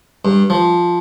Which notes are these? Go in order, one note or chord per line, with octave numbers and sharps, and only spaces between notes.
G2
F3